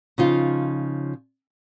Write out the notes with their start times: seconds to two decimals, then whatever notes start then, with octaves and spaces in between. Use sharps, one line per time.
0.18 C#3 F3 D#4 F4